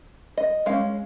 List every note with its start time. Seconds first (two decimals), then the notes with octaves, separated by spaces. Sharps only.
0.37 D#5
0.66 G#3 C#4 F5